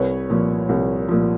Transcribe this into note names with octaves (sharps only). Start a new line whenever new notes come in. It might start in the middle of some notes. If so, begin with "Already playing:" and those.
Already playing: C2 B4 C#5
A#2 F3
C2
A#2 F3